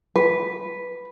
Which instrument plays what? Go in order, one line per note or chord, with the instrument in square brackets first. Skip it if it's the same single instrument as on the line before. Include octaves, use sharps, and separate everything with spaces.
[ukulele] B4